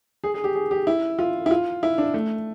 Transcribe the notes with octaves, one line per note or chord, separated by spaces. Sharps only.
G#4
G#4
G4
G#4
G4
E4
F4
E4
F4
E4
D4
A3